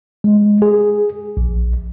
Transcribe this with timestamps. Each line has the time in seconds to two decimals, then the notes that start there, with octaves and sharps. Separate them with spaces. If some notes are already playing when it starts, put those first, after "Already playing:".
0.24 G#3
0.62 G#4
1.37 A#1